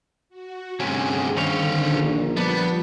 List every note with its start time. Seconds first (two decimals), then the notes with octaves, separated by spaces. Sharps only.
0.29 F#4
0.80 D2 G2 C3 C#4 G#4
1.37 D3 D#3 C#4 C5 C#5 F5
1.90 A#1
2.37 F3 G3 B3 D4 B6